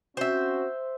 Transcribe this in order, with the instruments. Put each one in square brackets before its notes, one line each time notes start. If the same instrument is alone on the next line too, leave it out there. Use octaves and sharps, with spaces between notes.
[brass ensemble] C4 C#4 F#4 [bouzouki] C5 E5